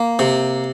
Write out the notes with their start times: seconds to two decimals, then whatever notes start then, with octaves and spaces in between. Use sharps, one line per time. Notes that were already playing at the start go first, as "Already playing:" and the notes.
Already playing: A#3
0.19 C3